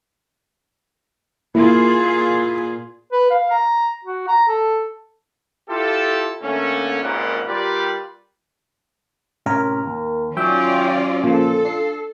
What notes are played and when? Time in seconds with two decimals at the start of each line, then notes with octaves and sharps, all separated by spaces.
1.55 A#2 A#3 E4 F4 G#4
3.12 B4
3.30 F5
3.51 A#5
4.05 F#4
4.28 A#5
4.48 A4
5.69 E4 F4 G4 A4
6.42 D3 A3 A#3 C#4
7.03 G#1 C#2 A#2 D#3 G3 F#5
7.47 G3 F4 G4 A#4 B4 D5
9.46 A2 C3 C#4 A#4
9.86 D#2
10.37 D#3 F#3 C#4 F4 D5 E5 G5
11.24 A#2 C#3 F3 F4 A4
11.65 D4 C7